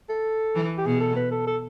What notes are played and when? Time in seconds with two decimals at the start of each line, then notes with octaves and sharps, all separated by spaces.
0.09 A4
0.55 E3
0.78 G4
0.85 B2 G#4
1.01 A4
1.16 B4
1.31 A4
1.47 A4